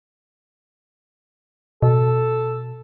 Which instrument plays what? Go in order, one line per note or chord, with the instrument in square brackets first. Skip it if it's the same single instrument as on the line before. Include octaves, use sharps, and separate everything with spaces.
[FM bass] B2 [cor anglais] A4